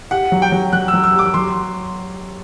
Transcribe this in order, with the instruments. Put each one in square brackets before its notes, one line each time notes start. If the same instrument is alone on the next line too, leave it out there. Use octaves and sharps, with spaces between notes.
[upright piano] G4 [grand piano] F#5
[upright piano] F#3
[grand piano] G5
[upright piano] F#3
[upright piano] F#3 [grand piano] F#6
[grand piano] E6
[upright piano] F#3
[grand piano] E6
[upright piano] G4 [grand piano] D6
[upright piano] F#3 [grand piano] C6